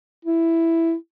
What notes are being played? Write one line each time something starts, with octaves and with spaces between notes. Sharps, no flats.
E4